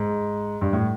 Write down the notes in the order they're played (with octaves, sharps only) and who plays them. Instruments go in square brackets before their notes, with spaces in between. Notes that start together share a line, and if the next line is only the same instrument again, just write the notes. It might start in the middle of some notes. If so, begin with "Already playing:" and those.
Already playing: [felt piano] G#2
G2
A2